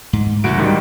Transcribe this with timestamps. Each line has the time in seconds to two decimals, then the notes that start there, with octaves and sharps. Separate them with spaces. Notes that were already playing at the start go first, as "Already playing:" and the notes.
0.13 G#2
0.44 C2 A2 C#3 E3 F#4 D7
0.58 G#2 D#3 G3